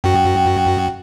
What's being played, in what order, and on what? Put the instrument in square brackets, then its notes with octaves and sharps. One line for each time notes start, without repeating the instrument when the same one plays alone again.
[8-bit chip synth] F#2 F#4 [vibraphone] G5